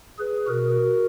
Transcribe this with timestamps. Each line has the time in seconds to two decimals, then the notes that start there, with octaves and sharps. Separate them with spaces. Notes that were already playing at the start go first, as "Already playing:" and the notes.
0.19 G#4 B4
0.47 B2 F#4 A#4